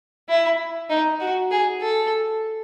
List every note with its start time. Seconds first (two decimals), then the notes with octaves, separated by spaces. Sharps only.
0.29 E4
0.90 D#4
1.20 F#4
1.51 G#4
1.82 A4